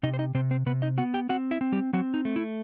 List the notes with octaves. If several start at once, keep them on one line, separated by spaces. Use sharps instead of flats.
C3 D#4 D#5
C5
D#4 D#5
C3 C4 C5
C4 C5
C3 B3 B4
D#4 D#5
B3 F#4 F#5
G4 G5
C4 F#4 F#5
E4 E5
C4
G3 G4
F#3 C4 F#4
D#4
A3
E4